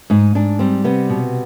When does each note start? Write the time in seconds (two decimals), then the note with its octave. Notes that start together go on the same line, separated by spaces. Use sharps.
0.10 G#2 D#4
0.35 G#2 D4
0.59 G3 C4
0.84 C3 B3
1.10 B2